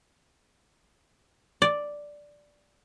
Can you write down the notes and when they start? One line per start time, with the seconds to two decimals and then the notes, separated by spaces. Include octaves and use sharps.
1.62 D5